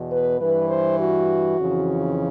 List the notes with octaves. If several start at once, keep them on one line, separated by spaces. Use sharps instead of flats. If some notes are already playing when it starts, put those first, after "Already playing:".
Already playing: E2 B2
B4
G2 E3 B4
C5
F#4
F2 C#3 E3